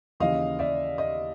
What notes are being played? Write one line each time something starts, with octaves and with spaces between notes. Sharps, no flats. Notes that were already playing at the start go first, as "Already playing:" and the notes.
D#2 C#3 E3 D#5 F5
D5 E5
D#5